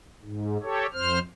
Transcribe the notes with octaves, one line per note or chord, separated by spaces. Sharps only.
G#2
G4 A4 C#5
F2 C5 F6